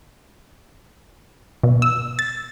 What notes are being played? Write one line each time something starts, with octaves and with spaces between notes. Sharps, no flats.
B2
E6
A6